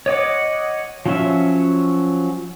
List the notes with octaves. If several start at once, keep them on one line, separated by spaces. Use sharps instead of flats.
C#5 D#5 F#5 D6
F3 F#3 C#4 F#4 E5